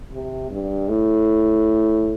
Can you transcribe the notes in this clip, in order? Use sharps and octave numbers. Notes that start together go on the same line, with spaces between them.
C3
G2
A2